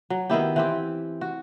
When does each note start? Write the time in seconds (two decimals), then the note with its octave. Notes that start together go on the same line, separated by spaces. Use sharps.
0.10 F#3
0.30 D#3 B3 E4 G4
0.56 E3 C4 G4
1.21 F#4